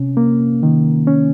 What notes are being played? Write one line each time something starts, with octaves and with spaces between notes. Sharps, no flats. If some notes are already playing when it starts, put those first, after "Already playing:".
Already playing: C3 C#4
A#3
D#3
C#4